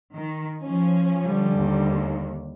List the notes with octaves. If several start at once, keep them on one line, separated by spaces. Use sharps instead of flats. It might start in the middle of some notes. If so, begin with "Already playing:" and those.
D#3
F3 C#4
D3 G3
D#2